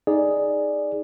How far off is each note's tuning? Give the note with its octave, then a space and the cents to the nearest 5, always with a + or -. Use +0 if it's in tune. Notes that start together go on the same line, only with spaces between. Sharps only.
D#4 +0 G#4 +0 D5 +0